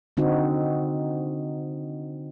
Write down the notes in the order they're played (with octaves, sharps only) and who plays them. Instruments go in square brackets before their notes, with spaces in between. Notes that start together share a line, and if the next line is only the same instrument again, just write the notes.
[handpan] D3 C4 D#4 F#4